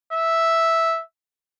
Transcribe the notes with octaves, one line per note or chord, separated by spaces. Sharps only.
E5